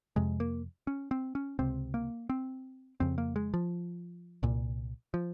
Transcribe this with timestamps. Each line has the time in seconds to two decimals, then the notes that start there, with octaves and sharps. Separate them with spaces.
0.16 F2 C3 G#3
0.40 A#3
0.87 C#4
1.11 C4
1.35 C#4
1.59 C#2 C3 C4
1.94 A#3
2.29 C4
3.00 F2 C#3 C4
3.18 A#3
3.36 G#3
3.54 F3
4.43 C2 A#2
5.14 F3